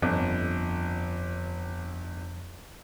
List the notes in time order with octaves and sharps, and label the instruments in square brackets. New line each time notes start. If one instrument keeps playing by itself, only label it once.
[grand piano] G1 [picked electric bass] F2